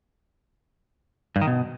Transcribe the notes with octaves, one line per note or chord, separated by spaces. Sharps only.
G2
D#3
B2